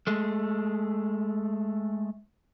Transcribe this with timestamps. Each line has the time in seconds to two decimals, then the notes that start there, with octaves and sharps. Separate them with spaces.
0.07 G#3 A3